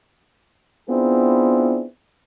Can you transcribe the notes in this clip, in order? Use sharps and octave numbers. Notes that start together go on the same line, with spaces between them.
B3 C4 D4 E4 F4 G#4